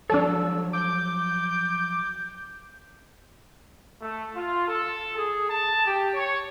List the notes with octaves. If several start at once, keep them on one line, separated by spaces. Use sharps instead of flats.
F3 F#3 D4 A4 C#5 E6
D6 G6
A3
F4
A4
G#4
A5
G4
C#5